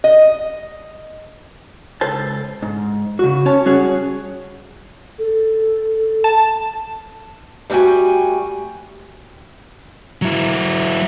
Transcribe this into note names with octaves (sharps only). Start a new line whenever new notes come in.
D#5
C#2 A4 C5 A5
G#2
C#3 F#4
C#4 C#5 A5
G3 C#4 F#4 G#4 C#5
A4
A5
G3 A3 F#4 G5 G#5
F#3 E4